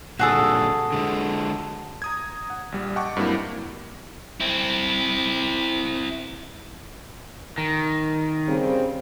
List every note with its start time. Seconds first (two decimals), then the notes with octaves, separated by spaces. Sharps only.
0.19 A#2 D3 G3 F#4 G#4 A4
0.92 D3 G#3
2.02 A#5 D#6 G#6
2.50 F#5
2.72 A#1 G3
2.96 D#5 F#5 G5 A5 C#6 D6
3.17 G2 F#3 G3 A#3 C4 E4
4.40 C4 E4
7.58 D#3
8.48 C#3 G3 C4